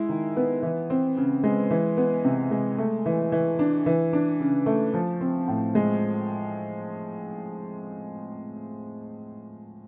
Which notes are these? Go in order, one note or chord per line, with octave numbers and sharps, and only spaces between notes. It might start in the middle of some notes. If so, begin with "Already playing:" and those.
Already playing: G#3 E4
D#3
B3
E3
C4
C#3
G#3
E3
B3
C3
G#3
A3
E3
E3
D4
E3
D4
C#3
A3
F3
C4
A2
G#3